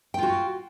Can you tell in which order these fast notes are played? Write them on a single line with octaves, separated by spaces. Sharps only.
G5 F4 F#4